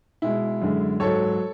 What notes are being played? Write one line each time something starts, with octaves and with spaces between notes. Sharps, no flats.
B2 G#3 E4
F#2 D3 G#3
G#2 F#3 A4 C#5